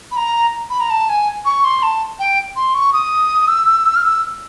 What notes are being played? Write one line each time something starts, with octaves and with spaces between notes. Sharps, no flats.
B5
A#5
B5
A#5
A5
G#5
C#6
C6
A5
G5
C6
C#6
D#6
E6
F6
E6